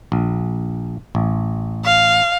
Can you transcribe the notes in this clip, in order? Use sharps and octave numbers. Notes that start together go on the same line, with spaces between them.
A#1
A1
F5